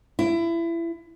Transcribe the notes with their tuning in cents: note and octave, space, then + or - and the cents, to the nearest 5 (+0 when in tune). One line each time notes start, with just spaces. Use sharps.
E4 +25